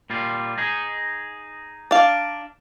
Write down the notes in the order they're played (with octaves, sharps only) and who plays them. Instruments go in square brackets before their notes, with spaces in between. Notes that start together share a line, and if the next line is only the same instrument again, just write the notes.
[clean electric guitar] A#2 G3 F4
D#4 G#4
[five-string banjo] D4 F5